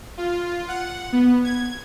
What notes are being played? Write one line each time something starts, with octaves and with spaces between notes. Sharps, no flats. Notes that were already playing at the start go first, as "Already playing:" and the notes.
F4
F#5
B3
G#6